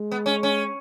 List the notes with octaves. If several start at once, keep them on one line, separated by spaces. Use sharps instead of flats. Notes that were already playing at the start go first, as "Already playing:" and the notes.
Already playing: G#3
B3
C#4
C#4